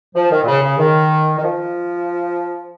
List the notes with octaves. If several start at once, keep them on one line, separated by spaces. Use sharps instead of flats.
F3
D#3
A#2
C#3
C#3
D#3
D#3
F3